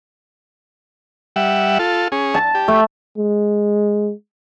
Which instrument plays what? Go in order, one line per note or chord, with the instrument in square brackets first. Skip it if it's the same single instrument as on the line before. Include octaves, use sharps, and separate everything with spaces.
[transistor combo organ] G3 E5 F#5
F4 A4
C#4 G#4
[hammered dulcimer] A5
[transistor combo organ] G4
[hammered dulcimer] A3
[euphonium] G#3